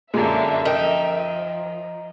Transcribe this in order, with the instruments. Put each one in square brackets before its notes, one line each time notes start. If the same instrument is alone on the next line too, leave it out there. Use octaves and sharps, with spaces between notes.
[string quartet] F#2 D3 A#3 [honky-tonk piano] A#2 G#3 [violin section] E5
[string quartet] F3 [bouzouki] D#4 [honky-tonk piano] A#4 G5